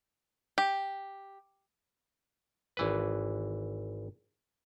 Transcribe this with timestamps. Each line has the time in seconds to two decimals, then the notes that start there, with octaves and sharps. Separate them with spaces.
0.58 G4
2.77 G#1 E3 B4